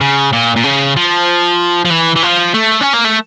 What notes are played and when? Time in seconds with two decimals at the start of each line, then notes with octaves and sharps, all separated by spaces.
0.01 C#3
0.33 A#2
0.56 A#2
0.64 C#3
0.96 F3
1.85 F3
1.90 E3
2.16 E3
2.23 F3
2.54 A3
2.81 C#4
2.93 A#3
3.04 A3